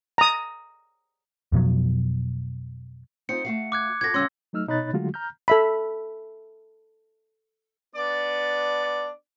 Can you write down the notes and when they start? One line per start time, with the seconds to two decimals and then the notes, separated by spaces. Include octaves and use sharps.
0.18 A#5 D#6
1.52 F2 B2 F3 F#3
3.29 C4 D#4 F4 C#7
3.45 A3 F#4 F5
3.72 D6 F#6 G#6
4.01 F4 F#4 A4 G#6 A#6
4.14 C#3 G3 C#4 C6 E6
4.53 F#3 A3 D#4 E6 F6
4.68 B2 D#4 C#5 B5 F#6 A6
4.93 D3 F#3 G#3 A3 F4 F#4
5.14 A#5 F6 G6
5.48 A4 E5 B5
7.95 B3 D4 D5